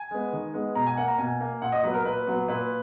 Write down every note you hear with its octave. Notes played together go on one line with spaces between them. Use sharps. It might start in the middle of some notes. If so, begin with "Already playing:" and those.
Already playing: G#5
G#3 B3
D#3
G#3 B3
B2 A#5
G#5
A#3 F#5
A#5
B2 G#5
A#3
A#2 F#5
D#5
F#3 B3 B4
A#4
A#2 B4
F#3 B3
A#2 B4